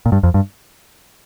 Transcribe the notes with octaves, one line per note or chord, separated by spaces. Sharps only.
A#2
G2
F2
G2